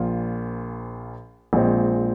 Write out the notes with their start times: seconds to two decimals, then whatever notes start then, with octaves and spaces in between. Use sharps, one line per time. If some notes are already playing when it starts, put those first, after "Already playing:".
Already playing: A#1 A#2 F3 A#3 F4
1.53 A#1 A#2 G#3 C4